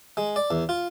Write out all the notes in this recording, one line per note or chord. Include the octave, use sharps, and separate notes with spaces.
G#3
D5
E2
F4